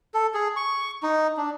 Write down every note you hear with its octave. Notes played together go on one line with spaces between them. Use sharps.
A4
G#4
C#6
D#4
D4